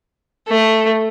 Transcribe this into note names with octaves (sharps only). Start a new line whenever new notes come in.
A3